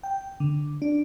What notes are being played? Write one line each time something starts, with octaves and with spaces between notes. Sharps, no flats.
G5
D3
D4